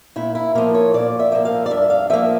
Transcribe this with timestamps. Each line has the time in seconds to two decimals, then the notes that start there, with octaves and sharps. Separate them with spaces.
0.16 A#2 E4
0.35 E4
0.55 F3 A#3 A#4
0.74 C#5
0.94 A#2 D5
1.19 E5
1.32 F3 A#3
1.45 F5
1.66 D5
1.71 G2 E5
1.90 F5
2.10 F3 A#3 E5